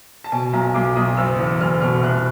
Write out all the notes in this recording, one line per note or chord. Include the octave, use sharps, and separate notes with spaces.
A5
B2 G#5
B1 A#5
B1 D6
B1 D#6
F#1 E6
E2
F#1 F6
B2 F6
C2 F#6